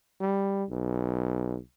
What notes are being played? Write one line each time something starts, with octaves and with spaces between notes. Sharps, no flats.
G3
B1